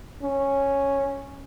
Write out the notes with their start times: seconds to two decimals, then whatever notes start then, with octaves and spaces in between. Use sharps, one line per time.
0.22 C#4